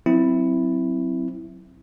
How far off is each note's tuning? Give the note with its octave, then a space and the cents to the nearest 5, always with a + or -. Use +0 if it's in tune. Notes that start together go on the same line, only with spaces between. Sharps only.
F#3 +0 C4 +0 E4 +0